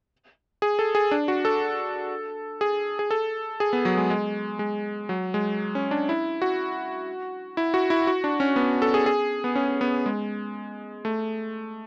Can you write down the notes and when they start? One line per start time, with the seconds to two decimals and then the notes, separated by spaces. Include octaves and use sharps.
0.62 G#4
0.79 A4
0.95 G#4
1.11 D4
1.28 F#4
1.45 A4
2.61 G#4
2.99 G#4
3.11 A4
3.60 G#4
3.73 B3
3.85 F#3
3.97 G#3
4.10 G#3
4.59 G#3
5.09 F#3
5.34 G#3
5.75 C#4
5.91 D4
6.09 E4
6.42 F#4
7.57 E4
7.74 F#4
7.90 E4
8.07 F#4
8.24 D4
8.40 C#4
8.56 B3
8.82 A4
8.94 G#4
9.06 G#4
9.44 B3
9.55 C#4
9.81 B3
10.06 G#3
11.05 A3